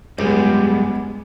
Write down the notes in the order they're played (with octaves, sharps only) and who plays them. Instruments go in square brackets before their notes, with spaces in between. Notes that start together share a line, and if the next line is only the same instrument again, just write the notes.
[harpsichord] C#2 [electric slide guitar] F#2 G3 [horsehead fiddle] G#3 B3 [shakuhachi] G4